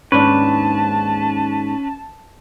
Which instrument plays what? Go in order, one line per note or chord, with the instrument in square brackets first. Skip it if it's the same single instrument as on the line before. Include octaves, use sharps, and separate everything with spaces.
[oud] D#2 G#2 D4 [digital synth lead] C#4 [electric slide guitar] B4 [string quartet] A5